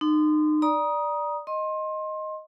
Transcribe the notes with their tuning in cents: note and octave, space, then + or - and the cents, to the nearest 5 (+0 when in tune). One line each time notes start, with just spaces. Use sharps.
D#4 -35 C6 -30
D5 +0 A#5 +30 D#6 +0
D#5 +0 C6 +25